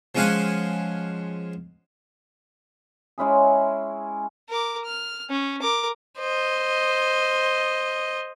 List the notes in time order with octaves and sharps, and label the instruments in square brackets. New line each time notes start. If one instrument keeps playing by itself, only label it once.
[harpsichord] F3 G#3 C#4 F5 F#5 G#5
[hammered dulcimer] G#3 C#4 E4 G#4
[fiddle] A#4 D6
F6
C#4
A#4 D6
C5 D#5